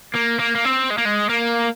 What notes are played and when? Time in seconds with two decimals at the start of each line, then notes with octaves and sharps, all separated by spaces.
0.14 A#3
0.39 A#3
0.55 A#3
0.65 C4
0.91 G#3
0.98 A#3
1.05 G#3
1.29 A#3